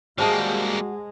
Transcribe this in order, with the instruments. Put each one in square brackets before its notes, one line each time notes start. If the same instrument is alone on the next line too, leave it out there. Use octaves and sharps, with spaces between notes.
[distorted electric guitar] G3 A#3 [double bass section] G#3 [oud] F#4 G#4 D#5 [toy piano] C5 A5